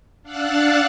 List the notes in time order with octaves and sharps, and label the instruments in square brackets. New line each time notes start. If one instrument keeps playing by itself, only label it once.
[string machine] D4 F5 F#5 E6 F#6 A6